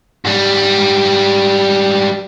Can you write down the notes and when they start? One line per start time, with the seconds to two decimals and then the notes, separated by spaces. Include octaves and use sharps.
0.25 G#2 G3